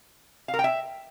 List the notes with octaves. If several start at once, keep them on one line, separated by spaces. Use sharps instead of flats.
F5
A#4
G5
E5